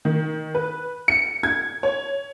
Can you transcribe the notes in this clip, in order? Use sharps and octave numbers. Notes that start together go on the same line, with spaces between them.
D#3
B4
C#7
G#6
C#5